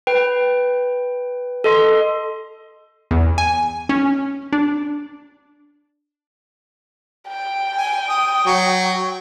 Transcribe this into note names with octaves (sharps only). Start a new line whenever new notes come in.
B4 G5
A4 D#5 C6
E2
G#5
C#4
D4
G5
G#5
D#6
F#3 C#6